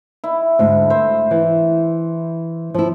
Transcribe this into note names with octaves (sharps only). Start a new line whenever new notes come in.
E4
D2 G#2
C5 E5
E3
F3 E4